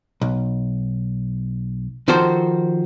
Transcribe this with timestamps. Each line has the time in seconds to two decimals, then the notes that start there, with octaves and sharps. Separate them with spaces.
0.21 B1
2.08 D#3 F3 F#4 A4 C5